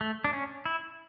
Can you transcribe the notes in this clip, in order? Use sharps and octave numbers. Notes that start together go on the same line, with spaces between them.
A3
D4
C#4
E4